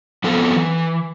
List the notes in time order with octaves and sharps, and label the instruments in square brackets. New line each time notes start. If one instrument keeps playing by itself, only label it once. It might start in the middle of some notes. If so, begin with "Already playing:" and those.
[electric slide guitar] F3 B3 C4 A4
E3